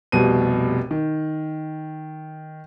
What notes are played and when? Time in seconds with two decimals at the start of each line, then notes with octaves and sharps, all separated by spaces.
0.12 F1 C2 B2 D#7
0.91 D#3